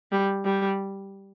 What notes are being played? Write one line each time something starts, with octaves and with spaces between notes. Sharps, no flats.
G3
G3